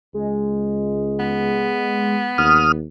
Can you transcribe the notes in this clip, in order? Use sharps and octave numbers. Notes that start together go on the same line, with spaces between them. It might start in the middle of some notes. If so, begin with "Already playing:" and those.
C#2 G#3
B3
D#2 D#6 F6